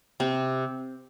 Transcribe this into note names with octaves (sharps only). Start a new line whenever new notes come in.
C3 C4